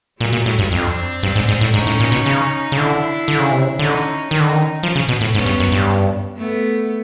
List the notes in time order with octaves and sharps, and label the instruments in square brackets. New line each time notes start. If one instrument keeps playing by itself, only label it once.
[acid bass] A#2 [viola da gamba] F#3 G#3
[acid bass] A#2
A2
G2
[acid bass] F2 [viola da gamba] C4 D4
[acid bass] G2
G#2
G#2
A2
[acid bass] G#2 [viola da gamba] C#4 D#4
[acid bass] A2
A#2
B2
C#3
C#3
[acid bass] D3 [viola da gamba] D4 E4
[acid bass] D3
C#3
C3
C#3
[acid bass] D3 [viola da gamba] C#4 D#4
[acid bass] D#3 [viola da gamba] C#4 D#4
[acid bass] D3
D#3
F3
C#3
B2
A2
[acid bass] G#2 [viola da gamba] B3 C#4
[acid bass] G2
F#2
G2
[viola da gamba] A3 B3